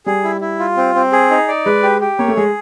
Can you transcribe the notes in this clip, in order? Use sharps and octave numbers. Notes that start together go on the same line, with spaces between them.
G3 G#4
E4
E4
F4
C4
C4
G#4
D#4
D5
G#3 B4
G4
G4
A#3 C#5
A3
G#3 G#4